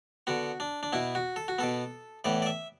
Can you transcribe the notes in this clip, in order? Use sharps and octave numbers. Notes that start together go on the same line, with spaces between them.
D3 B3 F#4
D4
D4
B2 B3 E4
F#4
A4
F#4
B2 B3 A4
A2 E3 B3 D5
D5
E5